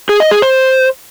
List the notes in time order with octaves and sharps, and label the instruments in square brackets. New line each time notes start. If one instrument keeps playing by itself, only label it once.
[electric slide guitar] G#4
D#5
G#4
C5